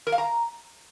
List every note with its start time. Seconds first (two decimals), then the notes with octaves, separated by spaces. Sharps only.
0.07 A#4
0.12 F5
0.18 A#5